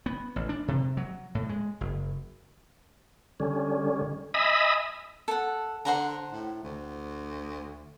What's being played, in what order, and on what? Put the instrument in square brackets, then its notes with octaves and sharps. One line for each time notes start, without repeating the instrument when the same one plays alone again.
[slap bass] B3
A1
D4
C3
F#3
A2
G#3
F#1
[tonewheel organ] D3 G3 C#4
D#5 E5 G#5 B5 D#6 E6
[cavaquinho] A4 F#5
[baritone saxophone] D3 [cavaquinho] C5 F#5 A#5
[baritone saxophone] A2
D2